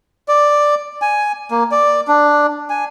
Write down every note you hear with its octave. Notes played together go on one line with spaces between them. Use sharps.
D5
G#5
A#3
D5
D4
G#5